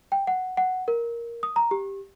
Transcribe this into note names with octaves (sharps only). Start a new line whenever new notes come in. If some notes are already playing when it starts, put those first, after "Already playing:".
G5
F#5
F#5
A#4
D#6
A#5
G4